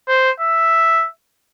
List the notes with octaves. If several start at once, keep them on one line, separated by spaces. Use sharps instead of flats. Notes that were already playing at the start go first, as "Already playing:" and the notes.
C5
E5